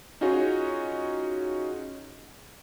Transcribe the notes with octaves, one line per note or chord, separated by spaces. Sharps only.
C#4 D#4 F4 F#4 G#4 C#5